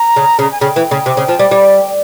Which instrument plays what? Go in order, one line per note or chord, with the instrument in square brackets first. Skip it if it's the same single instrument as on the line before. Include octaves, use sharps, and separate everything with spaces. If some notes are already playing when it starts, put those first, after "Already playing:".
Already playing: [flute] A#5
[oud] C#3
C#3
[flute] A#5
G#5
[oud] C#3 [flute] G5
[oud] E3
C#3
C3
C#3
F3
G3
G3